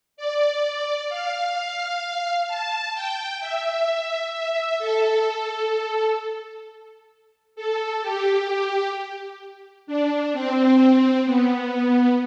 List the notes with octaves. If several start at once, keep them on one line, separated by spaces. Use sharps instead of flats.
D5
F5
A5
G5
E5
E5
A4
A4
G4
D4
C4
B3